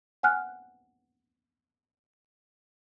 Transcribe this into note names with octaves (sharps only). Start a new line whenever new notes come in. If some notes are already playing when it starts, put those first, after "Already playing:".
F#5 G#5 F6 F#6